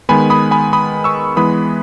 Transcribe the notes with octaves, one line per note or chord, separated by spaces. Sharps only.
D#3 G#3 B3 G#5 B5
B5 D#6
G#5 B5
B5 D#6
C#6 E6
E3 G#3 B3 B5 D#6